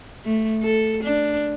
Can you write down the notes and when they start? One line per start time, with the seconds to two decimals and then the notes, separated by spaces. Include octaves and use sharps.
0.25 A3
0.63 A4
1.03 D4